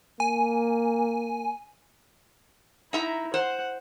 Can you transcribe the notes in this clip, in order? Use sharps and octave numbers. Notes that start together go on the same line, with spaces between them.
A#3 G#5
D#4 E4 E5 A#5
C5 F#5